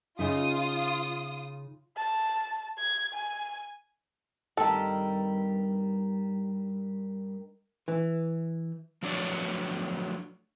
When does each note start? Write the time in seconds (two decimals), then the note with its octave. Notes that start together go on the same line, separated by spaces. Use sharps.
0.19 C#3 D#4 F4 E5 D#6
1.97 A5
2.78 G#6
3.13 G#5
4.57 G2 D#3 G3 C4 A4
7.88 E3
9.03 F3 F#3 A3 D4 C#5 D5